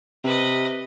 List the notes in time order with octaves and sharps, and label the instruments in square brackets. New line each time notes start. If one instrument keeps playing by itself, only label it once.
[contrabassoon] C3 [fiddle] B4 D#5